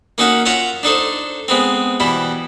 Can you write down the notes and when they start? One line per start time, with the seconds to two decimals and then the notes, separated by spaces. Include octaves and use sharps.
0.18 A#3 C#4 D#4 F#4 E5 F#5
0.45 F4 C#5 E5 F#5 A#5
0.83 D4 D#4 A4 C5
1.48 G#3 B3 C4
2.00 B2 E3 G3 E4